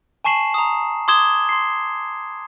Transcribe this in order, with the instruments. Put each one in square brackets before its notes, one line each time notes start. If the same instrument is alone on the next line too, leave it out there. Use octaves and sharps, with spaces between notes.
[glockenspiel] G#5 A5 C#6 C7 E7 F#7
A#5 D#6
C6 D6 D#6 G#6 E7 G7
C6 C7